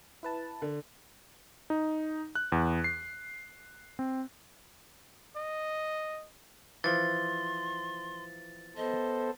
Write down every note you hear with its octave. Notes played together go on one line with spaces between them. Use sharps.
E4 B4 A5
D3
D#4
F#6
E2
C7
C4
D#5
E3 F3 C6 A6
B3 A4 C5 D#5